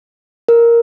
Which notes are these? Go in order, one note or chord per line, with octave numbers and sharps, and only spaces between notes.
A#4